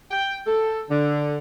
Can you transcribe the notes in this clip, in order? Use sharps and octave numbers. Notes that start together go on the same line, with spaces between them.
G5
A4
D3